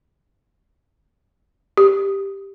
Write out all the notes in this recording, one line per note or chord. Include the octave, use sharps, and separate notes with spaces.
G4